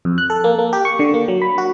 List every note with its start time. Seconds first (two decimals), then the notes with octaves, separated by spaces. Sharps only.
0.05 F2
0.18 F#6
0.30 A4
0.44 A#3
0.59 A#3
0.73 G4
0.85 C#6
0.99 D3
1.14 A#3
1.28 F#3
1.42 B5
1.58 F#4